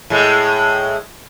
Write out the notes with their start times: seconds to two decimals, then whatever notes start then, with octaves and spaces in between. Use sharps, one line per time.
0.10 A2 G#3